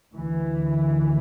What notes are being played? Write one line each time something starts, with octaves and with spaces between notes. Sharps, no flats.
D2 E3